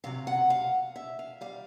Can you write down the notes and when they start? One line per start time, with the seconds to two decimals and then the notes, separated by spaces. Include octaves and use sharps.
0.04 D2 C3 F#3 F5
0.27 F#5
0.50 F5
0.96 E5
1.19 F5
1.41 D#3 G3 F5